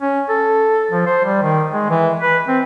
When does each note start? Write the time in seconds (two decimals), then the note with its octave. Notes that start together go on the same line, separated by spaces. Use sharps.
0.01 C#4
0.29 A4
0.91 F3
1.07 C5
1.24 G3
1.42 D#3
1.72 G#3
1.90 E3
2.20 B4
2.48 C4